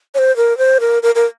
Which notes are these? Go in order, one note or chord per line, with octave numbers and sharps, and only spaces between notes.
C#5
C5
A#4
C5
A#4
A#4
A#4